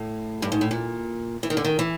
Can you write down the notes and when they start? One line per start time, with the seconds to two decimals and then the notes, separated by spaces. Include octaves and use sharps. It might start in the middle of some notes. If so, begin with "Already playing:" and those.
Already playing: A2
0.42 G2
0.52 G#2
0.61 A2
0.71 A#2
1.43 E3
1.50 D#3
1.57 D3
1.65 D#3
1.79 E3